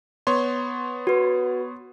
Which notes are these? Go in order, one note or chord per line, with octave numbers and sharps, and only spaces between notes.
B3 C#5 C6
F#4 B4